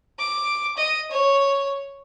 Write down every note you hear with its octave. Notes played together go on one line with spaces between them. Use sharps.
D6
D#5
C#5